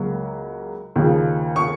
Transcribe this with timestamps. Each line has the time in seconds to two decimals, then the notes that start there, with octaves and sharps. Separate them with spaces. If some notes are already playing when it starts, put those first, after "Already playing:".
Already playing: C#2 C#3 F#3 A#3
0.96 D#2 C#3 F3
1.56 C#6